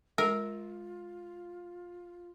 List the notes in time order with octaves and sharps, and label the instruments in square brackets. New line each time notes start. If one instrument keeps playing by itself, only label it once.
[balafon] G#3 [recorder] F4 [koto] A#4